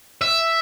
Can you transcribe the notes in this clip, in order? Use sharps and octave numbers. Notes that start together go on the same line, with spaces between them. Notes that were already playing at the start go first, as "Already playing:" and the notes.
E5